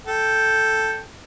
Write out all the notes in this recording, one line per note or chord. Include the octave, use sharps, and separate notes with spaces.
A4 G5